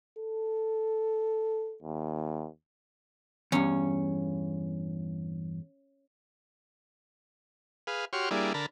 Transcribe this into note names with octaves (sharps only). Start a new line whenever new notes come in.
A4
D#2
E2 G2 C#4
G#4 B4 F5
F#4 G4 C#5 C6 F6
G3 A#3 D4 E4 G#4
D3 A#4 A5 B5